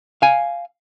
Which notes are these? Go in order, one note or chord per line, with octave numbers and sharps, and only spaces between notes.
F5 G#5